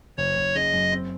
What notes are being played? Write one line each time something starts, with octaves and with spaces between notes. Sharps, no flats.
F#1 C#5
F#1
C#3 D#5
F#2
C4